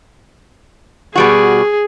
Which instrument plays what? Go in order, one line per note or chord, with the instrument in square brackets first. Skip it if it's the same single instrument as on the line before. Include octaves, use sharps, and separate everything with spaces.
[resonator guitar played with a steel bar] B2 G3 F#4 [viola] G#4